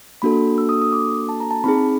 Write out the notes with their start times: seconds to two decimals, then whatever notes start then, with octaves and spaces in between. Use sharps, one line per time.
0.22 A#3 D4 F#4 A4 B5
0.58 E6
0.69 D#6
0.82 D#6
0.93 D6
1.29 A5
1.40 A#5
1.51 A5
1.64 C4 D#4 G#4 B5